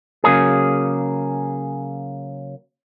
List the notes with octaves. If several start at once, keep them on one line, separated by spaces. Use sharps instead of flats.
C#3 F#3 A#3 G#4